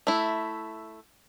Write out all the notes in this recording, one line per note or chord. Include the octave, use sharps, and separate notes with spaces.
A3 E4